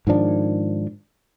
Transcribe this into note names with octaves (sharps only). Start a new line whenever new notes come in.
G#2 D#3 F3 D4